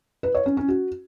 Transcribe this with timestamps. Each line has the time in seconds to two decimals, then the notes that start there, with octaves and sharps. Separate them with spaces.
0.23 B4
0.35 C#5
0.46 C#4
0.57 C#4
0.68 F#4